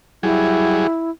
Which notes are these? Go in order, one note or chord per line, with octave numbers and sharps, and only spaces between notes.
F#3 G3 E4 G#4